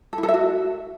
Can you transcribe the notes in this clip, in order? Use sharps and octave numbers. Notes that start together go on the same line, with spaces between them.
A4
E4
A4
E5
F#4